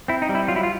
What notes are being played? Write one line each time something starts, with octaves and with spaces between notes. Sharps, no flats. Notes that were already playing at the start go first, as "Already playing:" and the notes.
C4 E4
D#4
G3
E4
F#3 F4
E4
F4